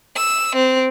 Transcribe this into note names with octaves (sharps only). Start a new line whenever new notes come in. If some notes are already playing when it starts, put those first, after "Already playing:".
E6
C4